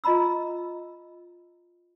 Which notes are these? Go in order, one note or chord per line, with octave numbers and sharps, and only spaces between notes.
F4 D#5 A#5 B5 E6